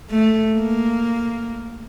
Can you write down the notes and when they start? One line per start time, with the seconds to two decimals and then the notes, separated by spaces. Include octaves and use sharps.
0.10 A3
0.53 A#3